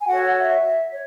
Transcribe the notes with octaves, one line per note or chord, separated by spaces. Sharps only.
G#5
F#4 A4 C#5 F#5
F#5
E5
C#5